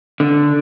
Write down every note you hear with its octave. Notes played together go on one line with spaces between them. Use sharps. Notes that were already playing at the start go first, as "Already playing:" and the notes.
D3